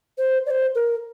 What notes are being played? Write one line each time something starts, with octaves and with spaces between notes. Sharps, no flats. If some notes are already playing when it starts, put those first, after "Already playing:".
C5
D5
C5
A#4